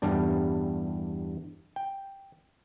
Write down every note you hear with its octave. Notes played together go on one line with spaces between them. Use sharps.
E2 G2 G3 D4
G5